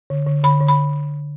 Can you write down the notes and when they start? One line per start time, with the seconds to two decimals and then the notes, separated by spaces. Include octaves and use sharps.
0.10 D3
0.27 D3
0.44 D3 B5
0.61 D3
0.68 B5